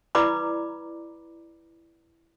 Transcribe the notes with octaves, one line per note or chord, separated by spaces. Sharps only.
E4 B4 D5 A#5 B5 D6